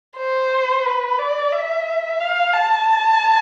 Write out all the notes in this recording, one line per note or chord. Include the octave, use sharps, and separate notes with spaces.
C5
B4
D5
E5
F5
A5